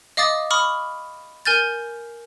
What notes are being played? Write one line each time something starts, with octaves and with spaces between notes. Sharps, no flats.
D#5 F5 D6 D#6 A6
B5 C#6 D#6 F6
A#4 G#5 F6 G6 A6